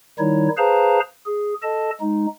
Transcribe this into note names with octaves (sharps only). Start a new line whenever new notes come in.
D#3 G3 D#4 E4 C#5
G#4 B4 C5 F5 A5 A#5
G#4
A4 D#5 A5
G#3 D#4